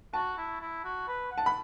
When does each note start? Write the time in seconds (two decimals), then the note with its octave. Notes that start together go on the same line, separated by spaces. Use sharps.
0.13 F#4 A5
0.38 E4
0.61 E4
0.84 F#4
1.08 B4
1.32 F#5
1.38 A5
1.46 B5